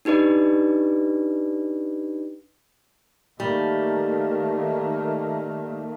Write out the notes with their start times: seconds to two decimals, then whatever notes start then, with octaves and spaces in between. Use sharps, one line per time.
0.05 D4 D#4 G4 B4 D5
3.40 D#3 G3 A3 A#3